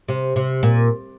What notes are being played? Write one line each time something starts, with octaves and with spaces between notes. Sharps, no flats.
C3
C3
A#2